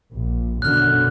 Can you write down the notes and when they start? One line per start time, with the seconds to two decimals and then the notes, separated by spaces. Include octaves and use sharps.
0.13 A#1
0.62 F#2 B2 D3 F6 F#6